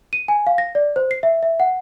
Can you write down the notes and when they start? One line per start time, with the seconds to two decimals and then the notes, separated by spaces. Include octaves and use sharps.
0.13 D#7
0.28 G#5
0.47 F5
0.58 A#6
0.75 D5
0.96 C5
1.11 C7
1.23 E5
1.43 E5
1.60 F#5